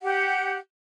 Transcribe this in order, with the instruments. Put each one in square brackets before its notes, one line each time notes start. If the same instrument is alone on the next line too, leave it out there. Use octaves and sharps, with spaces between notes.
[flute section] G4 F#5